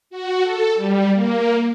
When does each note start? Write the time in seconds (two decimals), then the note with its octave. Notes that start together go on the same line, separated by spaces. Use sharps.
0.10 F#4
0.42 A4
0.75 G3
1.13 A#3